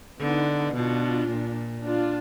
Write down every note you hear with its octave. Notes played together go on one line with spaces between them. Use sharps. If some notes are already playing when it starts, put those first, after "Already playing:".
D3 B3 D#4
B2 D4 F4
A#2
D4 F4